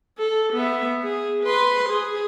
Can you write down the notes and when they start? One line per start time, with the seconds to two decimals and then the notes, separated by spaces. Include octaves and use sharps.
0.18 A4
0.53 B3 E5
1.03 G#4
1.44 B4 C6
1.89 G#4